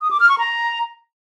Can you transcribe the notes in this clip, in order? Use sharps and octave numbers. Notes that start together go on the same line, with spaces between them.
D#6
D6
F6
C#6
A#5